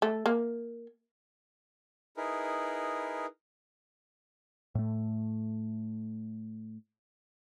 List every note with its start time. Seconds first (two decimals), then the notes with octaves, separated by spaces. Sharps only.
0.02 A3
0.26 A#3
2.17 D#4 E4 G#4 A#4 B4
4.75 A2 A3